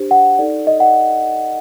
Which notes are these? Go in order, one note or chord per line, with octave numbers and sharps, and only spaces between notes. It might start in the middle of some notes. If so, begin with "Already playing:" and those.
Already playing: D4 G4 C5
F#5
D#4 A4 D5
D#5
F#5